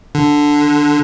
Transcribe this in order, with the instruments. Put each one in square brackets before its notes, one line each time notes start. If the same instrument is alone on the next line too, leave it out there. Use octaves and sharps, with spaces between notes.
[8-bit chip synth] D3